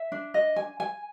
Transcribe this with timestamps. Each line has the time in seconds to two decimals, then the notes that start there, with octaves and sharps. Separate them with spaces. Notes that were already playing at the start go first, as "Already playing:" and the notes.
Already playing: E5
0.12 D4
0.34 D#5
0.56 G#5
0.80 G#5